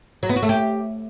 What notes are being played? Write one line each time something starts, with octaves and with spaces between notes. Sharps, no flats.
F#3
B3
F#4
A3
G4